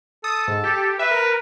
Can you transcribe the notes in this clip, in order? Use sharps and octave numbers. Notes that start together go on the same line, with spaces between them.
A4 D#6
G#2
G4
B4 E5
A#4